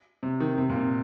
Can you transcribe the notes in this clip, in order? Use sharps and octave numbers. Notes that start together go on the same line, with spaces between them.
C3
D#3
C3
A#2
C3